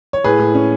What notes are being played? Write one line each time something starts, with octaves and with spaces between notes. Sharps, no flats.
C#5
A2 G#4 B4
A2
C#4